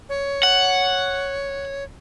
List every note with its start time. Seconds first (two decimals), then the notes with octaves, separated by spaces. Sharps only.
0.09 C#5
0.43 F#5